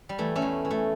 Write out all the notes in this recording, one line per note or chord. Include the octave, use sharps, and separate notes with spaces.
G3
E3 A3
A3 C#4
E2
E3
A3